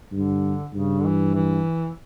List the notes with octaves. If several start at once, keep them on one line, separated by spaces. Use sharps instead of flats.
G2 D3
G2 C#3
D3
E3
E3